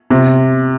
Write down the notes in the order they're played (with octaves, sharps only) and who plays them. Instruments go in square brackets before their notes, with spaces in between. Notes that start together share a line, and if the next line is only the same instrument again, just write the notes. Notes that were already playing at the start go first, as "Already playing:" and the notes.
[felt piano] C3